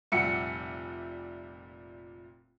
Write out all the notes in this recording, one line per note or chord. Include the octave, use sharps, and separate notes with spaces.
F1 A#2 G3 E5 F#5 C#7